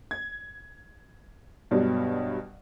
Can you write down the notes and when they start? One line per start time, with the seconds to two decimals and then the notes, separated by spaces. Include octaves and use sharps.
0.11 G#6
1.71 G2 B2 F#3 G3 B3